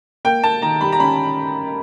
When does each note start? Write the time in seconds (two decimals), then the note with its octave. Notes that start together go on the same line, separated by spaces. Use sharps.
0.25 A#3 G5
0.43 A#3 A5
0.62 D#3 A#5
0.81 G3 B5
0.92 A#5
1.00 C#4 B5